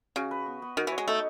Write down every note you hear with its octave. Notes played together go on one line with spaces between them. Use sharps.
C#3 F#4
B4
B3
B3
D#3 F#4
E3
C#5
G#3
A3 D#4